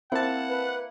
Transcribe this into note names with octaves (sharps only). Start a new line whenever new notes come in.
A#3 C4 E4 F#5 A5
B4